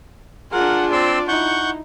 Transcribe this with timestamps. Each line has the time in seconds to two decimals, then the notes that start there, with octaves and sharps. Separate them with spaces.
0.52 D4 F4 G#4 A#4 F#5
0.92 C4 D5 C6 E6
1.28 D#4 E4 F#5 C#6 G6